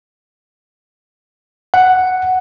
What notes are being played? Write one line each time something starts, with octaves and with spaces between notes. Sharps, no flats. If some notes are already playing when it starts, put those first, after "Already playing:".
F#5